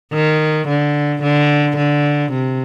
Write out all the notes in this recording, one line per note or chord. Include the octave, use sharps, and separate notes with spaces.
D#3
D3
D3
D3
C3